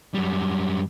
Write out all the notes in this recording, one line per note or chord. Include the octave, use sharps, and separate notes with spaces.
F#2 G3